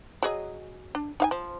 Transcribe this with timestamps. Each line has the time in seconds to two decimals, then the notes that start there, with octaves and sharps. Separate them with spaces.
0.23 F#3 G#4 D#5
0.95 D4
1.20 D#4 F5 G#5
1.31 F3